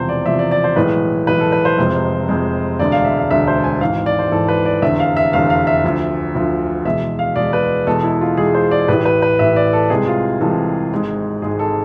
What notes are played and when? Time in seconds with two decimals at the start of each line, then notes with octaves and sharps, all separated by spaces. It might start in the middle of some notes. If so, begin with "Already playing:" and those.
Already playing: E1 E2 C3 F3 C5
0.09 D5
0.26 E1 E2 C3 F3 E5
0.39 D5
0.51 D5
0.64 C5
0.76 B1 A2 E3 G#3 B4
1.27 B1 A2 E3 G#3 B4
1.40 A4
1.52 B4
1.65 C5
1.78 F1 F2 C3 G#3
2.29 F1 F2 C3 G#3
2.79 E1 D2 D3 G#3 D5
2.92 F5
3.05 E5
3.18 F5
3.30 E1 D2 D3 G#3 E5
3.47 C5
3.64 G#5
3.81 G#1 G#2 E3 F5
4.06 D5
4.19 C5
4.32 G#1 G#2 E3 A4
4.48 B4
4.65 D5
4.82 F1 E2 D3 E5
5.00 F5
5.17 E5
5.33 F1 E2 D3 F5
5.50 F5
5.67 E5
5.84 D2 D3 F3
6.35 D2 D3 F3
6.85 E2 B2 G#3 E5
7.19 F5
7.36 E2 B2 G#3 D5
7.53 B4
7.87 E2 B2 G#3 A4
8.04 E4
8.21 F4
8.37 E2 B2 G#3 G#4
8.54 C5
8.71 D5
8.88 A1 A2 E3 B4
9.05 B4
9.22 B4
9.39 A1 A2 E3 E5
9.56 D5
9.73 A4
9.90 C2 C3 E3 G#3 G#4
10.07 F4
10.41 C2 C3 E3 G#3 A4
10.92 G#1 G#2 G#3
11.42 G#1 G#2 G#3 G#4
11.59 A4